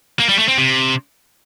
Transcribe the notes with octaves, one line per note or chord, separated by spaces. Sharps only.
A#3
G3
A3
C4
C3